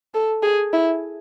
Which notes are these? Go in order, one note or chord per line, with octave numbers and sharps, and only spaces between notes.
A4
G#4
E4